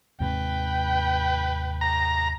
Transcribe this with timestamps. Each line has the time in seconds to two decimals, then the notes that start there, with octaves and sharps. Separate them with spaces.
0.20 D#2 G#2 C3 B4 G5
1.81 A#5